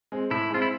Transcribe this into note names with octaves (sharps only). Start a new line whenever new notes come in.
G#3 C4
A2 E4
G#3 C4 F4
E4